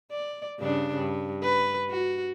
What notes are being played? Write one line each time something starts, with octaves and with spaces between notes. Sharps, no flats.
D5
G2 C#3 D4
G2
B4
F#4